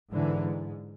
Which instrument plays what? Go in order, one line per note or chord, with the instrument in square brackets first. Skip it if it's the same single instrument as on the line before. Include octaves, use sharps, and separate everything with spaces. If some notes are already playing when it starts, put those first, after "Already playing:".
[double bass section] G#2 D3 E3